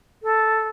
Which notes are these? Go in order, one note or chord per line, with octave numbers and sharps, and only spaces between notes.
A4